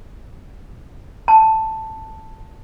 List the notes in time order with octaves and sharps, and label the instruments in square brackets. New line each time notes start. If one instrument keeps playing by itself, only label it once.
[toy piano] A5